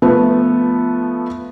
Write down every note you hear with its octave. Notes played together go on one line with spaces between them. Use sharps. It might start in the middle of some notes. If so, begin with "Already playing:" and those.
F3 A3 B3